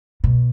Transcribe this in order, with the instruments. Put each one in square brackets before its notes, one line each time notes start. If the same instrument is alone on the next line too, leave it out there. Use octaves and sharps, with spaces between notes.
[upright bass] B2